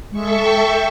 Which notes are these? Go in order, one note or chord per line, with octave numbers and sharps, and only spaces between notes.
G#3 A4 E5 C#6
G5